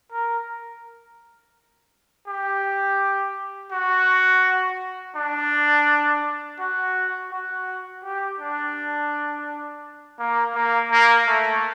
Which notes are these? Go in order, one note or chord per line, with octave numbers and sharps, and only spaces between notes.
A#4
G4
F#4
D4
F#4
F#4
G4
D4
A#3
A#3
A#3
A3